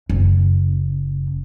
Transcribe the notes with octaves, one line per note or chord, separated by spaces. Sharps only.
F#1